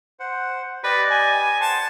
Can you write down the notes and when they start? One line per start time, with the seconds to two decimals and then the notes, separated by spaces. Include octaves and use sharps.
0.20 C5 F#5
0.84 G4 B4 D5 D#5
1.10 G#5
1.39 D#6
1.60 C5 F#5 A5 C6